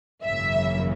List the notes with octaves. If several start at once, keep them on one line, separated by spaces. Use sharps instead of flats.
G#1 F#2 C#3 E3 A#3 E5